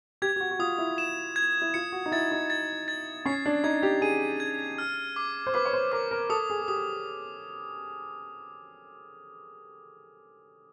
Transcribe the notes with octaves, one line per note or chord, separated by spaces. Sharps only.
G4 G#6
G4
F#4
F#4
F4 D#6
E4
E7
G#6
E4
F4 C#7
F#4
D#4
E4 A6
D#4
A6
A6
C#4 C7
D4
D#4 G#6
G4
G#4 D#7
G#6
F6
D6
C5
B4 D6
C#5
C5
A#4 D6
A#4
A4 D#6
G#4
G#4
G4 D#6